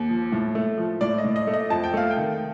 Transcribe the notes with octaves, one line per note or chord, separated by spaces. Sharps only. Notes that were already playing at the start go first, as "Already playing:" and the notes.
Already playing: D#2
F3
A2
A3
F3
A2 D5
D#5
A2
D#5
A3
D#5
F2 A5
G5
A3 F5
G5
D#3